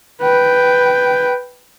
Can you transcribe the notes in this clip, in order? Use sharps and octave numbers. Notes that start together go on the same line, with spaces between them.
B4 G5